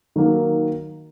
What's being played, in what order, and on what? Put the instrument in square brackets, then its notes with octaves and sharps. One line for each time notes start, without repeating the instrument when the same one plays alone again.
[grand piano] D#3 F#3 A#3